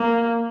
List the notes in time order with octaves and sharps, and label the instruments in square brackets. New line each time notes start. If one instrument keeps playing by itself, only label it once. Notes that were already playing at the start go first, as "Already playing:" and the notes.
Already playing: [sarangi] A#3